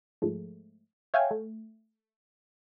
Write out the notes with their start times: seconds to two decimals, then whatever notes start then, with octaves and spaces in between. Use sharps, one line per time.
0.22 G#2 F3 G#3 A3
1.14 C#5 E5 F5 G5 G#5
1.31 A3